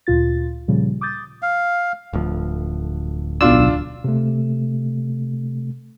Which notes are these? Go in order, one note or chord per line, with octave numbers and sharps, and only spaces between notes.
D2 A#2 F4 A6
A#2 C#3 F3 G3
D6 D#6 G6 A6
F5
D1 D2 F3
B1 D4 F4 E6
C3 A3